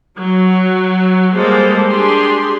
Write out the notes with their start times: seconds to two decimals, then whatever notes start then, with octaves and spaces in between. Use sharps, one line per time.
0.18 F#3
1.33 G3 G#3 A#3 A4 C5
1.88 D4 G4 G#4 C6